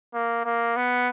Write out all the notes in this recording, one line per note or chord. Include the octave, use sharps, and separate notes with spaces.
A#3
A#3
B3